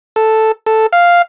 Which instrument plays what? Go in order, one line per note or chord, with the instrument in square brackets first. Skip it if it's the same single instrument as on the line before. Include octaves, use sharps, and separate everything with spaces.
[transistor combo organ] A4
A4
F5